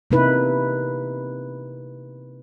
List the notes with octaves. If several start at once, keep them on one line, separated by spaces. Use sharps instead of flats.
C3 A#3 D#4 E4 B4